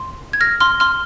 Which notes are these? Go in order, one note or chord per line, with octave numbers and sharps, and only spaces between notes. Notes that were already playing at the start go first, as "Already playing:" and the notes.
Already playing: C6
G#6
F6 A#6
C6 F6
C6 F6